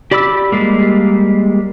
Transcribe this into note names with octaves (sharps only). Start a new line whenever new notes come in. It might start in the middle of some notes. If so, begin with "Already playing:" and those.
G4 D5 B5 D6 E6
G3 G#3 A#3